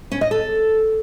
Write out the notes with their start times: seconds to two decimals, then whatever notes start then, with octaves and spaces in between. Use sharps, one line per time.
0.12 C#4
0.21 D#5
0.31 A4